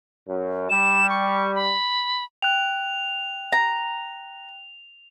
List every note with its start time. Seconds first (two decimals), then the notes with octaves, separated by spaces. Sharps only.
0.26 F#2
0.70 G3 E7
1.10 C#6
1.55 B5
2.42 G5 F#6 F7
3.52 A#5